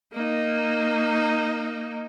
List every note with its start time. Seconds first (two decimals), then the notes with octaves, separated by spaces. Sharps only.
0.13 A#3 D#4